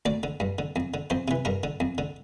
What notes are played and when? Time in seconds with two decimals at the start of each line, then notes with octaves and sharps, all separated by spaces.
0.06 D2 D5
0.23 D3
0.40 G2
0.59 D3
0.76 F2
0.94 D3
1.10 F2 C5
1.28 C3 E3
1.45 G2 A#4
1.63 D3
1.80 F2
1.98 D3